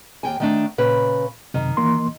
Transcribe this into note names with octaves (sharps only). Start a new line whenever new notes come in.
D#2 G5 G#5
D#3 A3 D4
A#2 C#3 B4
F#2 C3 D#3
E3 A#3 C6